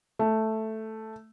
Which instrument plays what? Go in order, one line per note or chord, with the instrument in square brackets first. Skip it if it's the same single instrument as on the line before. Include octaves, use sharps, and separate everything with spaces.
[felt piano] A3